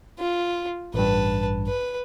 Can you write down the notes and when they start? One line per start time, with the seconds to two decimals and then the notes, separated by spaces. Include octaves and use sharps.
0.19 F4
0.94 A1 G2 B4 A5
1.67 B4